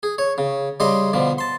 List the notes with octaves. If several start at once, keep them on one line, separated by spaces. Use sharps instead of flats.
G#4
C#5
C#3
C#3 G3 D#5 C6
B2 D3 F3
A5 C6